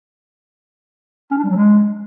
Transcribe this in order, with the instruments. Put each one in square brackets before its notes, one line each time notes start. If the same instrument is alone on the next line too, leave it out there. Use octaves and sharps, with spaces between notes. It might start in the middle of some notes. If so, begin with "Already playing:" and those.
[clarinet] C#4
D4
G3
F#3
G#3